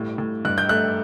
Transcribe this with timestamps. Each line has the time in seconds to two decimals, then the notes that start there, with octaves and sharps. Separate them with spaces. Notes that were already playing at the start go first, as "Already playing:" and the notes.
Already playing: G1 A2 G3
0.18 A2
0.45 G2 F#6
0.58 G6
0.69 A3 F#6